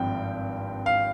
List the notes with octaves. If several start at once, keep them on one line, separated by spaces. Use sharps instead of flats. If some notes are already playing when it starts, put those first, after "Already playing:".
Already playing: G#1 G2 F3 C4 G5
F5